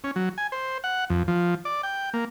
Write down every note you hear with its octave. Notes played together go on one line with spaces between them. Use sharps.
C#4
F#3
G#5
C5
F#5
F2
F3
D5
G5
A#3